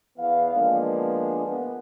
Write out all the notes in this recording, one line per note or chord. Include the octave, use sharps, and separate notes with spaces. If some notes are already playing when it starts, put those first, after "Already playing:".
E2 E3 B3 F5
D3 F3 G#3 A#3 B3 D4
B3